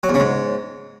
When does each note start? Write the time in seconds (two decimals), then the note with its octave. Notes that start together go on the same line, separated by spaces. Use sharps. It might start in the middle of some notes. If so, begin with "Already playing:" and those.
0.03 F#3
0.09 E2
0.14 C#3
0.20 G#2